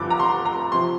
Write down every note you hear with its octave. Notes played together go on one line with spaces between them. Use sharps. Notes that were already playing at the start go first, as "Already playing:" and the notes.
Already playing: G2 D3 F3 D6
A#5
C6
A#5
C3 F3 C6